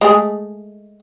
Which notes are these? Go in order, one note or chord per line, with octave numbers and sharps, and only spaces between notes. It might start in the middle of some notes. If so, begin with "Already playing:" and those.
G#3 A3 G#4